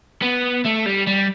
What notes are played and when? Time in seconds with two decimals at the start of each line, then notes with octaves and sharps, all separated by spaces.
0.22 B3
0.65 A3
0.86 G3
1.07 G3